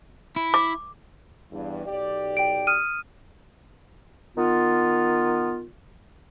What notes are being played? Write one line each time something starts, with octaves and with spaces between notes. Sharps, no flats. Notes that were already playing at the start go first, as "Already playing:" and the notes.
E4
D6
E2 G2
B1 G4 D5
G5 D7
D#6 F6 D#7
D#3 B3 F4